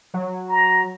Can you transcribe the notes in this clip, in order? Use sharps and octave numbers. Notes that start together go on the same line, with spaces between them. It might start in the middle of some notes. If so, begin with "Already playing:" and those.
F#3
A#5